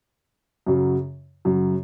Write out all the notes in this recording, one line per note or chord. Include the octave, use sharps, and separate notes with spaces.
F#2 C#3 F#3
F#2 C#3 F#3